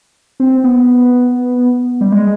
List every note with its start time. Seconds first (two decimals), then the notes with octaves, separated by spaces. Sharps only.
0.40 C4
0.64 B3
2.01 G3
2.12 G#3